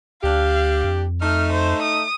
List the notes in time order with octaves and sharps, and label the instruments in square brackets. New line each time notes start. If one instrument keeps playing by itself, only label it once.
[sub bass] D2 [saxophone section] D4 G4 [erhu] F5
[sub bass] F2
[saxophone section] A3 D#4 [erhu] F6
[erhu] C5
D#6